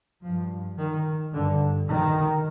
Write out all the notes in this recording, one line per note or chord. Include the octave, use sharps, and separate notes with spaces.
G2 F3
D#3
G2 D3
D#3